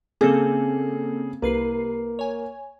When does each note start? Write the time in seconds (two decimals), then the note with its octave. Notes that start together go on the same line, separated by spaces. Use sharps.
0.21 C#3 A#3 C4 G#4 A4
1.42 C2 A#3 B4 C7
2.19 C#5 G#5